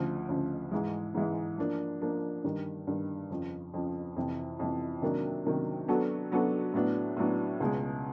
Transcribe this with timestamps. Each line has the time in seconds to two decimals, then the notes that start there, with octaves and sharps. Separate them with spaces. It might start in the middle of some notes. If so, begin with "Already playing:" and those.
Already playing: D2 C#3 F3
0.29 D2 C#3 F3
0.71 G#2 E3 G#3
1.14 G#2 E3 G#3
1.58 F3 A#3 D4
2.01 F3 A#3 D4
2.44 G2 D#3 G3
2.87 G2 D#3 G3
3.30 F2 C#3 F3
3.74 F2 C#3 F3
4.16 F2 C3 E3
4.59 F2 C3 E3
5.02 C3 D#3 F#3 A#3 D4
5.46 C3 D#3 F#3 A#3 D4
5.88 F#3 B3 D4 F#4 A4
6.32 F#3 B3 D4 F#4 A4
6.74 A2 F#3 B3 D4
7.17 A2 F#3 B3 D4
7.60 C#2 B2 G#3